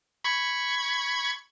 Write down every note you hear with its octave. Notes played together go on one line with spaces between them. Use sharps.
B5 C#6 G#6